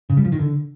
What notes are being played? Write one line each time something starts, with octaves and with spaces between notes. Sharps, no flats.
C#3
G3
F3
D#3
D3